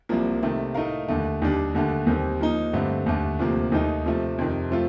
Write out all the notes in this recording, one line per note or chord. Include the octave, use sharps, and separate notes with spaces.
C2 C3 F3 A#3
C3 D#3 A3
A2 A3 D#4 A#4 F5
D#2 D3 A3
D#2 D#3 G3 D4
D#2 D3 A3
D#2 D#3 G3 C4
F3 A#3 D#4
G2 D3 A3 C4
D#2 D3 A3
D2 C3 F3 A#3
D#2 D#3 A3 D#4
C3 F3 A3
F2 C3 D#3
F3 A3 C4 F4